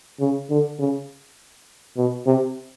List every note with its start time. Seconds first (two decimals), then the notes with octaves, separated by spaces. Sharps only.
0.20 C#3
0.50 D3
0.79 C#3
1.97 B2
2.27 C3